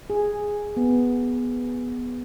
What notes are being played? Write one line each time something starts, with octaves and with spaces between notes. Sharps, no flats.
G#4
B3